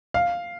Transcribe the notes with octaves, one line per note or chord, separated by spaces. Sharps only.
F5